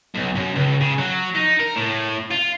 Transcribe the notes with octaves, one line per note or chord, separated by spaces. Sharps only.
B1
F#2
C#2
C#3
F#3
D#4
A#4
A2
F4